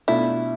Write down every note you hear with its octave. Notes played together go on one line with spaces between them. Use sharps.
B2 A3 D4 E4 F4